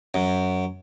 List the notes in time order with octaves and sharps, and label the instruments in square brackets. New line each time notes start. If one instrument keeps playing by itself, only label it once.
[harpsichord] F#2